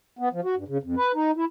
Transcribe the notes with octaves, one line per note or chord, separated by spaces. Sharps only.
B3
F3
F#4
G2
C#3
F2
B4
D#4
E4